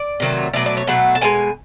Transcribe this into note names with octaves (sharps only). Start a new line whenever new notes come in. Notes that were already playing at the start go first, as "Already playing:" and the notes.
Already playing: D5
C3 D#3 F#3 A3
B2 F#3 A3 D5
D5
C#5
B2 F#3 A3 F#5
A5
B2 G#3 G#5